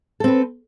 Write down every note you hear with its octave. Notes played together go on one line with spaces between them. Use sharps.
C4 A4 B4